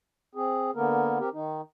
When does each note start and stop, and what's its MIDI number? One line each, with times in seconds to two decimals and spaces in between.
0.35 0.71 60
0.35 0.71 68
0.76 1.19 50
0.76 1.19 58
0.76 1.19 59
0.76 1.19 70
1.20 1.29 60
1.20 1.29 67
1.20 1.29 70
1.33 1.61 51
1.33 1.61 63